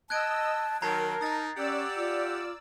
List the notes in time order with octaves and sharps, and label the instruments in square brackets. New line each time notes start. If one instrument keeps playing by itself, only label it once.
[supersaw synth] D#5 E6 [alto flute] A5 [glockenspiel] F#6 G#6 D7
[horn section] D#3 F#3 [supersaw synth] A#4 [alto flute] A5 [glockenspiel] A#5 G#6 C7
[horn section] D#4 [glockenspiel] D#6 A6
[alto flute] C#4 [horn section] G4 F#5 [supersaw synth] D5 E6
[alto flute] F4